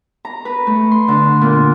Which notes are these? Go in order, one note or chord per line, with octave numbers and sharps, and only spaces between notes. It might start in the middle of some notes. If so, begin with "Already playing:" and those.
A#5
B4
A3
C6
D3
A#2